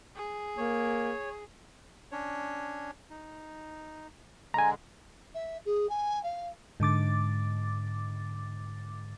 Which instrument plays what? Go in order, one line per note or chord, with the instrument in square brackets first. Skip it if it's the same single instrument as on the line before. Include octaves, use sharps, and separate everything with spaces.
[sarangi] G#4
[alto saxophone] A#3 [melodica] C#5
[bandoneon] C#4 D4 C#5
D#4
[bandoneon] D3 G#3 [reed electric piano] G#5 A#5
[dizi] E5
G#4
G#5
F5
[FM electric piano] G#2 D3 D6 A6